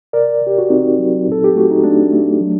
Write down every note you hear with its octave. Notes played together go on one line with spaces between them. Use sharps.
C3 A#4 D5
C3
G4
F#4
C3 C4 D#4
F#3
A#2
A4
G4
A3 F#4
D#4
A3 D4
A3
F#3